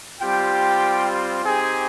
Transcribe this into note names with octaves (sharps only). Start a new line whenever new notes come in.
G3 C4 F4 G4 G5
C4 D#4 G4 G#4 G#5